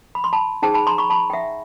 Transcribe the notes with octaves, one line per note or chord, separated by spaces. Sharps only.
B5
C6
A5 B5
D#4 G#4 C5 G5 A5
A5 B5
A#5 C6
B5 C#6
A5 B5
G5
E5 F#5